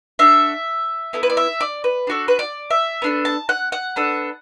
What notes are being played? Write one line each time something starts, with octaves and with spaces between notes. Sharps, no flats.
D4 F#4 A4 E5
B3 E4 A4
B4
D5
E5
D5
B4
D4 F#4 A4
B4
D5
E5
B3 D4 A4
A5
F#5
F#5
B3 D4 A4